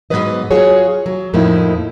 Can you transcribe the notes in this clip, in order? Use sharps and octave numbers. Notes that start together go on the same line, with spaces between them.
G#2 B2 F#3 B3 B4 D#5
F#3 F4 F#4 G#4 C#5
F#3
F2 A2 F3 A#3 D#4 E4